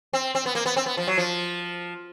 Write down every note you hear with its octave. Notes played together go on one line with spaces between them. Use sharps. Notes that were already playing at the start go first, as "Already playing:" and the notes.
C4
C4
B3
A#3
B3
C4
B3
F3
F#3
F3